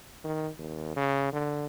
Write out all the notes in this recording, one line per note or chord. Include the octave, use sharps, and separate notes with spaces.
D#3
D#2
C#3
D3